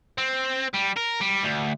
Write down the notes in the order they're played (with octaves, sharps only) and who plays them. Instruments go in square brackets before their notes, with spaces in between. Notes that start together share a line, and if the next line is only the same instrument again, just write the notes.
[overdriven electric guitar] C4
G3
A#4
G3
D2